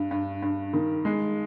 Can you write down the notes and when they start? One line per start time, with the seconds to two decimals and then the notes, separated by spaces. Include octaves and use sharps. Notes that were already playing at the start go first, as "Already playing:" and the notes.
Already playing: G2
0.11 G2
0.42 G2
0.73 D#3
1.05 G#3